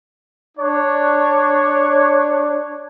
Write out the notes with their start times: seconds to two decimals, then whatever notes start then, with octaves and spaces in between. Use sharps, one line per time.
0.58 D4 C#5